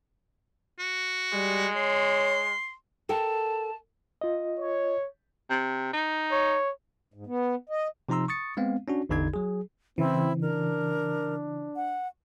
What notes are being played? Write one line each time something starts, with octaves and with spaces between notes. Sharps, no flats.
F#4
G3 G#3
C#5 C6
A4 A#4 G5 A5
F4 D#5
C#5
C3
D#4
C#5
G#2
B3
D#5
C3 F3 D#4 A#5 C6 E6
C#6 D#6 A6 C#7
G#3 B3 C4 F5
C#4 D4 F#4
A1 E2 D3 D#4 G#6
F#3 G#4
C#3 E3 C4 E4
D4 A#4
F#5